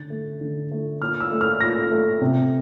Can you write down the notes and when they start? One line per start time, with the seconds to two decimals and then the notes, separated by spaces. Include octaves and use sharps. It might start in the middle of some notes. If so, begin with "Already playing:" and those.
Already playing: D3 A6
0.10 A3
0.41 D3
0.71 A3
1.01 A#2 F6
1.20 E6
1.31 A3
1.41 F6
1.61 A#2 A#6
1.91 A3
2.21 C3